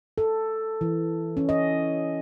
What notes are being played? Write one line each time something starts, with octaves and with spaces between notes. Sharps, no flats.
A4
E3
C#4
D#5